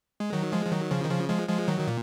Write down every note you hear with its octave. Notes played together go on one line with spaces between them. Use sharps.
G#3
D#3 F#3
F3 G#3
F3
D#3 F#3
C#3 F3
D#3
C#3 F3
F3 G#3
F3 G#3
D#3 F#3
D#3
A#2